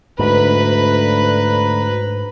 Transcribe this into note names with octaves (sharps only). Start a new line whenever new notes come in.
D2 G#2 B4 A#5 B5